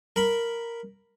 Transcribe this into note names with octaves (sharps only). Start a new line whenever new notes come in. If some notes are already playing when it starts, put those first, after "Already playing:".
A#4 B5